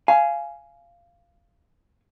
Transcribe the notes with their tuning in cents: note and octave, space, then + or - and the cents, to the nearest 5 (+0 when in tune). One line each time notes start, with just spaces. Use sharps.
F5 -15 G#5 +10